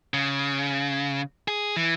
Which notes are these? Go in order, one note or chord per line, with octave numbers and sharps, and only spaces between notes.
C#3
G#4
E3